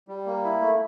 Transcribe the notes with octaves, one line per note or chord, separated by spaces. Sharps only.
G3
A#3
E4
A3